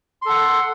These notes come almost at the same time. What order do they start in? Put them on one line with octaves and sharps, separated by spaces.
C6 A4 F#5